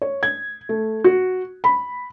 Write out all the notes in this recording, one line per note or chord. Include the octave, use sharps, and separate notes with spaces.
C#5
G#6
A3
F#4
B5